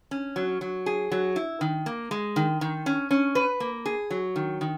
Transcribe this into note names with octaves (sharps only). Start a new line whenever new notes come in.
C#4
F#3
F#3
G#4
F#3
E4
D#3
A#3
G#3
D#3
D#3
C#4
C#4
B4
A#3
G#4
F#3
D#3
D#3